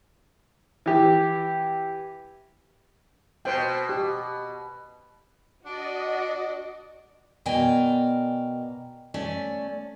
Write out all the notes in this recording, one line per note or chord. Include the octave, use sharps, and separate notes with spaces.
E3 G4
B2 C5 G5
G4
D4 F#4 D5 D#5
B2 A#4 D5 G5 G#5
A3 C#4 D5